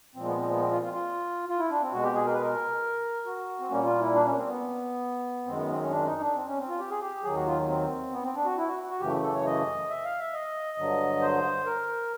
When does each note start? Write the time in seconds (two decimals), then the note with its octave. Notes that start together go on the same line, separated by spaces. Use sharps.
0.15 A#2 F3 G#3 C4
0.26 B3
0.37 C4
0.49 B3
0.60 C4
0.71 F4
0.82 F4
0.93 F4
1.49 F4
1.59 E4
1.70 D4
1.81 C4
1.92 B2 G#3 F#4
2.03 G4
2.15 G#4
2.26 A#4
2.34 B4
2.42 A#4
3.26 F#4
3.60 C4
3.70 A#2 G3 A#3 C#4
3.85 F4
3.99 E4
4.14 D4
4.25 C#4
4.37 C4
4.47 B3
5.46 F#2 D#3 G#3 C4
5.57 B3
5.69 C4
5.80 C#4
5.91 D4
6.06 D#4
6.21 D4
6.35 C4
6.47 C#4
6.58 C4
6.69 F4
6.80 G4
6.90 G#4
7.01 G4
7.23 D#2 D#3 F#3 G#4
7.36 F#4
7.46 F4
7.68 C4
8.12 B3
8.23 C4
8.35 D4
8.45 F#4
8.57 E4
8.68 F#4
8.90 F#4
9.01 F#2 C#3 E3 A3 G4
9.23 A4
9.34 C#5
9.46 D#5
9.89 E5
10.05 F5
10.20 E5
10.34 D#5
10.78 G2 D3 F#3
11.22 C5
11.66 A#4